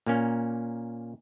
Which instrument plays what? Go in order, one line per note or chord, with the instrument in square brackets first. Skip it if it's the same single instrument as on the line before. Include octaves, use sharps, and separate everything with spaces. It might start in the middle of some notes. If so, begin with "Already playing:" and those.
[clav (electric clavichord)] A#2 A#3 C#4